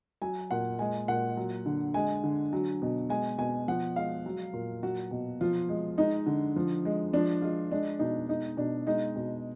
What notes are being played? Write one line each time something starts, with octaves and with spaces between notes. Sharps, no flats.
F#3 G#5
A#2 F#5
G#3 G#5
A#2 F#5
F#3
D3
G#3 G#5
D3
F#3
B2
G#3 G#5
B2 G#5
F3 F#5
G#3 F5
F#3
A#2
F#3 F#4
B2
F3 F4
G#3
G#3 D#4
D3
F3
G#3
F3 D4
G#3 F4
G#3 D4
B2 D#4
G#3 D#4
B2 D4
G#3 D#4
B2